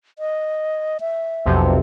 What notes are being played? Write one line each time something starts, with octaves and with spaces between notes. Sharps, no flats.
D#5
E5
B1 F2 C3